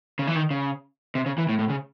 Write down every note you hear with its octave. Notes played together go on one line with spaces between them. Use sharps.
C#3
E3
D#3
C#3
C3
C#3
E3
A2
A2
C#3